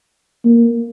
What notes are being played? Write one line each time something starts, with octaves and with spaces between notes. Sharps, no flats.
A#3